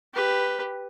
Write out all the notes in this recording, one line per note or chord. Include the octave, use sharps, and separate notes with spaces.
G4 B4